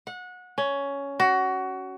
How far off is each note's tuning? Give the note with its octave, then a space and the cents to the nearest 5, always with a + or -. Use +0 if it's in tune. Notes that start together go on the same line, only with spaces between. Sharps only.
F#5 -25
C#4 +10
F#4 +20